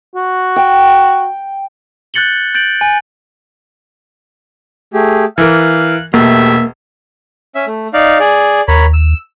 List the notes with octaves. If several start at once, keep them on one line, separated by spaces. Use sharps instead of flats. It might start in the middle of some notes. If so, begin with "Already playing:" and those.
F#4
G5
F#6 G6 A6 C#7 F#7 G7
G6 A6 D7 F#7
G#5
A3 G4 G#4
E3 A#4 F5 F#6
E1 A3 A#3 G4 E5
C#4 E5
A3
D#4 D5 F5
G#4 D5
D#2 A#4 C#5 B5
E6